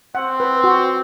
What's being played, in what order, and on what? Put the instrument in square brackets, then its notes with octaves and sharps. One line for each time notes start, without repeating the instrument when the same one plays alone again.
[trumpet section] C4 [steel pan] F#5
[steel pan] B4
F#4